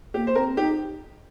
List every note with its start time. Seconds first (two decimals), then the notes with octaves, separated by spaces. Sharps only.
0.14 A#3 G4
0.27 C5
0.35 C4 A#4
0.57 D#4 G4